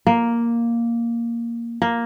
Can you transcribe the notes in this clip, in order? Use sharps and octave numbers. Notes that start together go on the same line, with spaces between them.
A#3
A#3